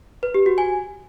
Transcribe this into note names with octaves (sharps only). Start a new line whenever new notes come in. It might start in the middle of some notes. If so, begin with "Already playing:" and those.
B4
G4
F#4
G#5